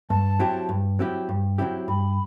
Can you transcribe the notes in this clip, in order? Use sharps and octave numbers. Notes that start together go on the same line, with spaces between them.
G2 A5
F#3 C4 E4 G4
G2
F#3 C4 E4 G4
G2
F#3 C4 E4 G4
G2 B5